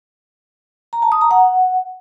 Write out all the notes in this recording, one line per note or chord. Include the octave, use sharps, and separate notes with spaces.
A#5
A5
D#6
A#5
F#5